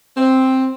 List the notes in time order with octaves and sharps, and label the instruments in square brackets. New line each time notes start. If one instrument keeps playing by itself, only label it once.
[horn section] C4